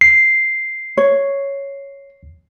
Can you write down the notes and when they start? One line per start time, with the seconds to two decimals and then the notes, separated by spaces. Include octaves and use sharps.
0.01 C7
0.97 C#5